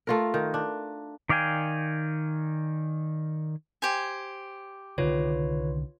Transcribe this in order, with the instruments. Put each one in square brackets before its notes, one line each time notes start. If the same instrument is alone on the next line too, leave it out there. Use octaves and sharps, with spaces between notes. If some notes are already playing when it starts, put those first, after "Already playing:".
[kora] A3 F4 A#4
D#3
D4
[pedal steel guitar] D#3 D5 F5 G5 G#5
[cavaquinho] G4 C5 G#5
[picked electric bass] C2 D3 D#3 [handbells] F4 B4 C#5